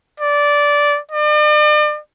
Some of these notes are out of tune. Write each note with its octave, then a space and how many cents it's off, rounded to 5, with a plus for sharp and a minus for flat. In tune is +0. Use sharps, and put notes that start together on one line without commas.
D5 -10
D5 +40